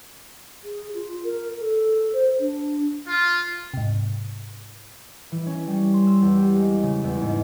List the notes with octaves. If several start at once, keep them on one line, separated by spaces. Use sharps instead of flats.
G#4
F4
A#4
A4
C5
D4
F4
G#2 C3
E3
C#4
G3
C6
E6
E2
G4
G#3
D6
C#3
E2
G#2